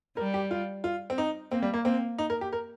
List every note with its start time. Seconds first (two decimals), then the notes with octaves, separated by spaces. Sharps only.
0.17 G3 A#4
0.34 G4
0.51 F4
0.84 F4
1.10 C4
1.18 D#4
1.52 A#3 C4
1.63 G3
1.74 A#3
1.85 A#3 C4
2.18 D#4
2.30 A#4
2.41 G4
2.53 A#4